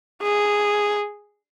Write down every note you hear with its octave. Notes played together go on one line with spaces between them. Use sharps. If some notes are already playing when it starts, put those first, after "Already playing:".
G#4